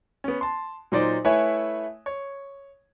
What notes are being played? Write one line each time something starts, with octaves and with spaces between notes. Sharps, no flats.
B3 C#4
A5 C6
A#2 F#3 D#4 C5 D5
A3 E4 B4 C#5 E5 G#5
C#5